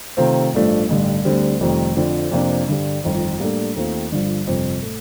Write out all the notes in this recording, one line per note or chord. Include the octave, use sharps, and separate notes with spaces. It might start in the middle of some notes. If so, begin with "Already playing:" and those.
C3 D#3 A3 C4 F4
A1 G2 F3 A3 D4
A1 G2 D3 G3
D2 D3 G3 C4
F1 F2 D#3 G3
F2 D3 F3
F2 C3 F3 A#3 D4
G2 D3 G3
G1 F2 D#3
A2 G3 A#3 D4 A4
D#2 D#3 A3 C4 F4
G1 G2 D3 F3
G1 F2 C3
A2 A3